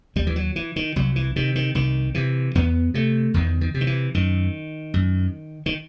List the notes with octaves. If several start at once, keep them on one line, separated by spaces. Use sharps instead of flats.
D#2 G3
E3
F#3
E3
D#3
C2 F#3
E3
C3 D#3
D#3
C2 D#3
C3 E3
E2 B3
C3 A3
E2 D#3
D#3
C3
D#3
E3
F#2 D#3
F#2
D#3